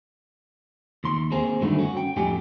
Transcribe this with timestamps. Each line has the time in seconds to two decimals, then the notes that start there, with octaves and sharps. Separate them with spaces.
1.04 D#2 C6
1.32 A#3 C4 G#4
1.61 G2 D3 D#3 F#3 A3 B3
1.79 C#4 F#4
1.97 G5
2.16 F2 A2 F3 G4 G#5